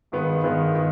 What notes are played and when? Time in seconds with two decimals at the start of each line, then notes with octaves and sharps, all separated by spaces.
0.12 G2 D#3 G#3 B3
0.43 G2 D#3 G#3 B3
0.75 D#3